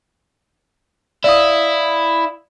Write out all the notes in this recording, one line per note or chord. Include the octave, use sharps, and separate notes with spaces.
E4 D5 F5 D#6